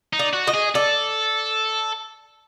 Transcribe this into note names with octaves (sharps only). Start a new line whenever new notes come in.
D#4
D5
F#4
D#5
G#4
A4 D5